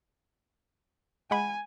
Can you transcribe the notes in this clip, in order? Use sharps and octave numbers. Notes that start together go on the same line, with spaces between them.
G#3 F#5 G#5 B5